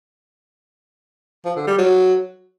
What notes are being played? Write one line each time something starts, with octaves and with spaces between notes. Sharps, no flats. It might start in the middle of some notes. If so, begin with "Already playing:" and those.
F3
D3
G3
F#3